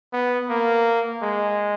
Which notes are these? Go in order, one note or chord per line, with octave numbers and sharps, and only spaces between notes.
B3
A#3
G#3